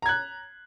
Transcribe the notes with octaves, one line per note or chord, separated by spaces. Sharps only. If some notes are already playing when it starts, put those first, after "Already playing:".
A#5 F#6 G#6